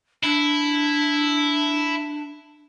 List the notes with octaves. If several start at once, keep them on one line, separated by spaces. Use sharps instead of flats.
D4 E4